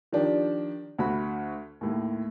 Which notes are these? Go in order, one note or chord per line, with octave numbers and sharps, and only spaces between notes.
D#3 F3 D4 G4
D2 F#4 B5
D#2 A2